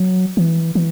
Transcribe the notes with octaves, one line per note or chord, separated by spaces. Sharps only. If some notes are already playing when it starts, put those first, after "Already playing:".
Already playing: F#3
E3
E3